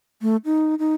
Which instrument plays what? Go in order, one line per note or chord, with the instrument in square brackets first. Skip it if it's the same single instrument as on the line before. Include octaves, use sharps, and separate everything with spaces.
[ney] A3
D#4
D#4